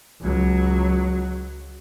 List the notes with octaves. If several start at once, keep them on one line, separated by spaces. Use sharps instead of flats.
C#2 F#3